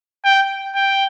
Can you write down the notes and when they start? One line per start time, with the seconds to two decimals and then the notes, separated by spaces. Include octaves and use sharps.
0.25 G5
0.75 G5